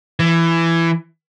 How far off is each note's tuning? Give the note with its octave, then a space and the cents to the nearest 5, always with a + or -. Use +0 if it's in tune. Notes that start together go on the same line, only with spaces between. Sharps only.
E3 +15